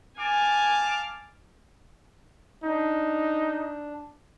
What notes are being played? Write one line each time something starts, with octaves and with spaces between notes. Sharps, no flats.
F5 G#5 A5 D6
D4 D#4